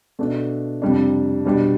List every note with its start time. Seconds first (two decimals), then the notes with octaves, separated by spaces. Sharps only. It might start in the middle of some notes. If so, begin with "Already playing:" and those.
0.19 B2 A3 D4
0.82 F2 C3 G3 D4
1.45 B2 G3 D4